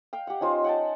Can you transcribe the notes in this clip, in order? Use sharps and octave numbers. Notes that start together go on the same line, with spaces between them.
F5 G5
G4 F#5
C#4 D#4 F4 C5
F#5 G5 A5